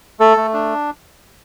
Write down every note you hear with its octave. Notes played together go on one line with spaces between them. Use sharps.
A3 A4
A3
D4